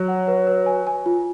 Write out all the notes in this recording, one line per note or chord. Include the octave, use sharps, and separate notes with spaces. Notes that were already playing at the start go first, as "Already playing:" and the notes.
Already playing: F#3
F#5
B4
B4
G#5
G#5
F4